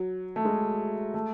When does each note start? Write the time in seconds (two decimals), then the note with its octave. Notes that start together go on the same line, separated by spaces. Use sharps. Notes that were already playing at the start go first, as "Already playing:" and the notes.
Already playing: F#3
0.36 A3
0.45 G#3
1.14 A3